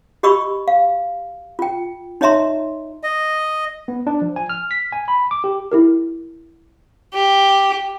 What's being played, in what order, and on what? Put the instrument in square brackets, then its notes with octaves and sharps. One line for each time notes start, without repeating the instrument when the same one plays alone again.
[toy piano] F#4 G4 D#5 B5 C#6 E6
F5
F4 G5
D#4 C#5 D#5 E5 A#5 C6
[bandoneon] D#5
[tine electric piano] B3
D4
F3
G#5
F6
B6
G#5
B5
D6
G4
[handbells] E4 G4 A#4
[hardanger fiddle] G4